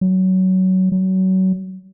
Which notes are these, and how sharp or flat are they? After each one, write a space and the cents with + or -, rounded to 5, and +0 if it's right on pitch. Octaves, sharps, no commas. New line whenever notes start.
F#3 +15
F#3 +25